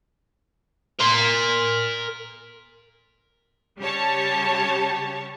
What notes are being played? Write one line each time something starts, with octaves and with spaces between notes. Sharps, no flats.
A#4 C6
C#3 G3 G4 C#5 A5